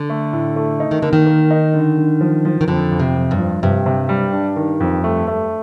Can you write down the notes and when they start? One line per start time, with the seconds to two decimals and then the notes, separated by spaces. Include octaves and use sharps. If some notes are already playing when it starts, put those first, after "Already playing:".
Already playing: D3
0.10 A3
0.33 A2
0.56 A3
0.80 D#4
0.91 D#3
1.02 D3 A#3
1.13 D#3
1.26 A#3
1.51 D#4
1.74 D3
1.97 D3
2.21 F3
2.45 F3
2.61 D#3
2.68 F2 D3
2.92 F2
3.00 C3
3.16 F2
3.31 G2
3.39 F3
3.63 G2 C3
3.86 C3
4.09 G3
4.32 D4
4.56 D#3
4.80 F2
5.04 A3
5.28 A3